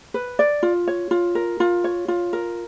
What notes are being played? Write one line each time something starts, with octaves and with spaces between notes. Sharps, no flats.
B4
D5
F4
C#5
F4
A#4
F4
C#5
F4
A#4